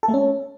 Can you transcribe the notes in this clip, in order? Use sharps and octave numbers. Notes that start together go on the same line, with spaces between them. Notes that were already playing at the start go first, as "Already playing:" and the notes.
A4
A3
C#4